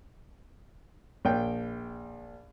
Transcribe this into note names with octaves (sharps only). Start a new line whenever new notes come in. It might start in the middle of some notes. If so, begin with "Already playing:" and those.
A#1 G5